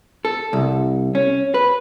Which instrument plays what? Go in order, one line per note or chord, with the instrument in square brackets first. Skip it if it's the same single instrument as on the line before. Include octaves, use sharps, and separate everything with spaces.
[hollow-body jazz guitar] A4
C2
C#4
B4